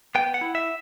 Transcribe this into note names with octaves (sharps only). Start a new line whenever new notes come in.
B3 G5
F#5
E4
E5